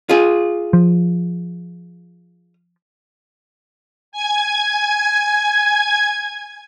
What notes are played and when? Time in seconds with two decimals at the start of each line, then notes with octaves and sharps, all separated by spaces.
0.09 F4 G#4
0.73 F3
4.12 G#5 G#6